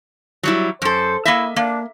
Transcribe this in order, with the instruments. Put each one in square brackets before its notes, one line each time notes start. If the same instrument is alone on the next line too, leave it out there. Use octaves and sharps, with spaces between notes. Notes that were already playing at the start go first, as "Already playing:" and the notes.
[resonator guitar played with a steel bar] F#3 G3 E4
[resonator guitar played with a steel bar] F#2 A4 [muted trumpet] C5
[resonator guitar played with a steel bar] A#3 D#5 E5 [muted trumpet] E4
[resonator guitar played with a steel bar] A#3 [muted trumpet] D4